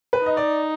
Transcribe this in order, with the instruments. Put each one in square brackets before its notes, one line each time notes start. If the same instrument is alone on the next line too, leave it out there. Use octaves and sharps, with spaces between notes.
[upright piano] B4
[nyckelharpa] D#4 [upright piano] D#5
[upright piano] D5